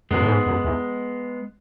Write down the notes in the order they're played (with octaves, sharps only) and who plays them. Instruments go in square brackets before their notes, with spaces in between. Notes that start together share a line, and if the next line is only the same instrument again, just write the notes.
[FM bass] F#2 [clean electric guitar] G#3 B3
[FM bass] A2
G#2
F#2
E2